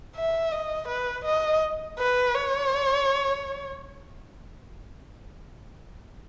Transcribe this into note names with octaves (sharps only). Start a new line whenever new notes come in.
E5
D#5
B4
D#5
B4
C#5